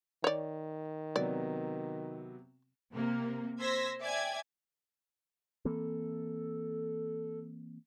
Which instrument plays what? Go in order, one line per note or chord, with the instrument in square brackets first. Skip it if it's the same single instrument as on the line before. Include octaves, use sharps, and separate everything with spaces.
[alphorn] D#3 [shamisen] C#5 D5
[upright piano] C3 F#3 B3 [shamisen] D5
[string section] C3 A#3
C5 C6 E6 G#6 A#6 B6
D5 E5 G5 G#5 G#6
[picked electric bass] E3 A#3 C4 [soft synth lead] A4